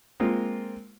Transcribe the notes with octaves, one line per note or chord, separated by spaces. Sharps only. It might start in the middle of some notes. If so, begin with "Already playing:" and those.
G#3 A#3 C4 F4